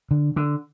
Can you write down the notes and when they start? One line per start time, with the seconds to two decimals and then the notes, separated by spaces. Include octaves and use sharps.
0.11 D3
0.36 D3